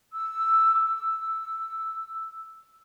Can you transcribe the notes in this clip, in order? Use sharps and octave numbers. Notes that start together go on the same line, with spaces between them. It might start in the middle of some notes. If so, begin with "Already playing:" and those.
E6
D6
E6